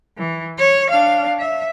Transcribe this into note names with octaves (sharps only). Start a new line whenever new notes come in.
E3
C#5
D4 F5
E5